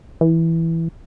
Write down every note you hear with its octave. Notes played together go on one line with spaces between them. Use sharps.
E3